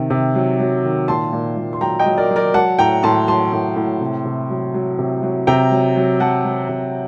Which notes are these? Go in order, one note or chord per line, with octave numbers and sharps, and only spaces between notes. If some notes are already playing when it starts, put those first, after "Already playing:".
Already playing: C3 D#3
C3
F#3
F#3
D#3
A#2 A5 C6
A#2
A#2
C6
F#3 G5 A#5
D#5 G5
F#3
A#4 D5
F#3
A#4 D5
F#3 F#5 A5
A2 G5 A#5
A2 A5 C6
F#3 A5 C6
A2
A2
C3
C3
F#3
F#3
C3
F#3
C3 G5 A#5
F#3
F#3
F#3 F#5 A5
F#3
C3